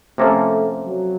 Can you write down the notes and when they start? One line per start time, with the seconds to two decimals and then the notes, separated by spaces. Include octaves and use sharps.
0.18 C3 F3 A3 A#3 C#4 A4
0.86 F#3